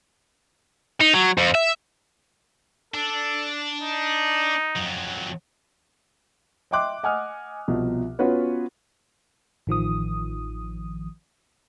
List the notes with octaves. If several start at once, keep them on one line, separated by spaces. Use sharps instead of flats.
D#4
F#3
F2
E5
D4 A4
D#4
F2 F#3
D#5 E5 G5 C6 D6 F#6
D#5 F#5 G#5 D#6 F6
C2 B2 F3
B3 C#4 F4 F#4 B4 C#5
A1 D#3 F3 D#6